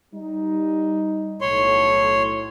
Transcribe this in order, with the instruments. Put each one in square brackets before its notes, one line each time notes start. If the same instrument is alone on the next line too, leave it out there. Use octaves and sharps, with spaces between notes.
[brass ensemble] G3 D#4
[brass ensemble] B1 A2 [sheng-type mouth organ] C#5 C6